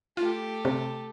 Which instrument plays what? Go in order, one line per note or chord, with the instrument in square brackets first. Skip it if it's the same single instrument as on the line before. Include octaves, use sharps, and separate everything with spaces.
[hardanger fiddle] A3 G4 [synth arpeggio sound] F4
[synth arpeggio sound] C3